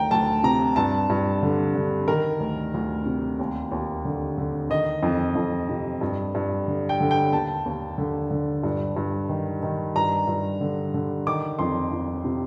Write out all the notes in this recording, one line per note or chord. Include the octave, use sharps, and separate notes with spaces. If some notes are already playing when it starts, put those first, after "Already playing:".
Already playing: D2 D#3 G5 A#5
D2 A5
C3 A#5
G2 A5
G2
D3
D3
D#3 A#4
D2
D2
C3
D#2
D#2
D3
D3
D#3 D#5
F2
F2
C3
G2
G2
D3
G5
D3
G5
D#2 A5
D#2
D3
D3
G2
G2
D#3
D#3
G2 A#5
G2
D3
D3
D#3 D6
F2 C6
F2
C3